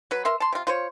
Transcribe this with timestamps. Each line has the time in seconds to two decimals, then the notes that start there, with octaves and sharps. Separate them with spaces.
0.11 F#3 B4
0.25 A#4 E5 C6
0.40 A5 C6
0.52 C3 F4
0.67 F4 C5 C#5